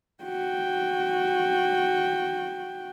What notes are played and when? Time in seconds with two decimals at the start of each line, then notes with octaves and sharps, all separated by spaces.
0.23 F#4 G5